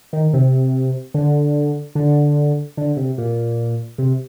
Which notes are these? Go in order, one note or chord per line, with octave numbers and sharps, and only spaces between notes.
D#3
C3
D3
D3
D3
C3
A#2
C3